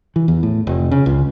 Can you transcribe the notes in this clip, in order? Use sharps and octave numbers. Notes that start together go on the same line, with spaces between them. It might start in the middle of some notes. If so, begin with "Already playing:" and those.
E3
E2
A2
F1
C#3
C#2